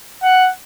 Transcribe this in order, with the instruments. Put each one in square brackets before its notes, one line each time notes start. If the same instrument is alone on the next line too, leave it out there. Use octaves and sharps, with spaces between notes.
[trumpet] F#5